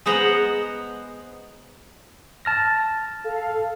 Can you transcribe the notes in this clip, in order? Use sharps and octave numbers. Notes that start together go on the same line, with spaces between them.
G#3 B3 C5 F#5 A#5
A5 F6 A#6
A4 F5